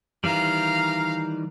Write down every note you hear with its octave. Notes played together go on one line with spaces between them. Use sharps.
D#3 E3 G3 F5 A#5